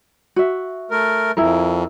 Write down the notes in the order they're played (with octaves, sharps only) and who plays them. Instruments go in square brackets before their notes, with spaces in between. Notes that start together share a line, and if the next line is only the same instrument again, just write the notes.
[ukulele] F#4 E5
[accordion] A3 A#4
[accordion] F2 [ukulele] E4 G#4 A#4